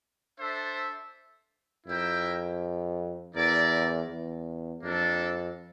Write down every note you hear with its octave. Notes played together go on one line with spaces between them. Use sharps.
D4 A4 C5 E5
F2 E4 A#4 E5 G5
E2 E4 A#4 D5
E2
F2 A#3 D4 A4